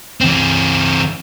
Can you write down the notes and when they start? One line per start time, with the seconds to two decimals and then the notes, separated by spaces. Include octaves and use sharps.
0.21 E3 C4